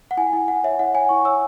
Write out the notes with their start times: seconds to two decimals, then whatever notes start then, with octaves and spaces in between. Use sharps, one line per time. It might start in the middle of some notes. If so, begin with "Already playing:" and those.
0.11 F#5
0.17 E4 G#5
0.33 E4
0.48 E4 F#5
0.64 C#5 E5
0.79 E4 F#5
0.94 C#5 G#5
1.09 E4 C#6
1.25 C#5 E6